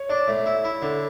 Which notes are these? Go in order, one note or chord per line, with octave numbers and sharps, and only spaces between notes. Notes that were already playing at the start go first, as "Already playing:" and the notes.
Already playing: C#5
D4 D5
A2 E5
E4
E4
D3